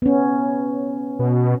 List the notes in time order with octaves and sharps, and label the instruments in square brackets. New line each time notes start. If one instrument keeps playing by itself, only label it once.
[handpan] B3 C#4
[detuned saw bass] B2